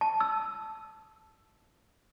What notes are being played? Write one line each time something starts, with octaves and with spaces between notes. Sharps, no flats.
A5
E6